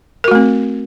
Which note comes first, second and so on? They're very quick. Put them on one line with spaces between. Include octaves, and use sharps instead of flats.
A#4 F#4 A3 C4